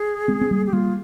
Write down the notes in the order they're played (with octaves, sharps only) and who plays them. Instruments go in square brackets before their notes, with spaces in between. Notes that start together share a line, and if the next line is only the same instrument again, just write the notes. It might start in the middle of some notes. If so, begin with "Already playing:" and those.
Already playing: [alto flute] G#4
[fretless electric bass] G#3 C4
C4
G3 A#3
[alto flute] G4
[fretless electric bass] G3 A#3 [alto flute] F4